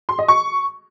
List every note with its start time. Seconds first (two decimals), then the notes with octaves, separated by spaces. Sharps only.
0.09 C6
0.19 D#5
0.28 C#6